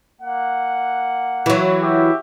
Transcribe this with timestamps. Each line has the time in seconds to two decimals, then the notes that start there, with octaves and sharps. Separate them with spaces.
0.20 A#3 F#5
1.46 E3 F#3
1.82 F#4 G4 E5